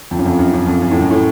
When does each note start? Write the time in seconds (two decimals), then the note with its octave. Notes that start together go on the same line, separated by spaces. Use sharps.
0.11 F2
0.19 F#2
0.26 F2
0.39 F#2
0.53 F#2
0.67 F2
0.82 F#2
0.91 A2
1.00 F#2
1.11 A2